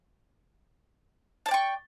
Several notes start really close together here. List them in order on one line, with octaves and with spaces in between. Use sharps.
A5 D5 G5 C#6